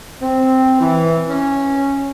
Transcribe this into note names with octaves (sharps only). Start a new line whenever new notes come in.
C4
E3
C#4